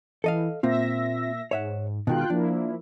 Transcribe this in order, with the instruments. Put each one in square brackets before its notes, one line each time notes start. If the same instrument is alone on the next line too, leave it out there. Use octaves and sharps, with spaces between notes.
[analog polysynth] E3 [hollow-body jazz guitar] A4 D#5 F5
[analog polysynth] A#2 E5 A#6 [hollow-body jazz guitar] A#3 C4 F4
[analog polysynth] G#2 [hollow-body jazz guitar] C#5 E5 F#5
[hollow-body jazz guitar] B2 D#3 G#3 [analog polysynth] F4 G5 F#6
[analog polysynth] F3 A#3 E4 [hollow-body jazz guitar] D4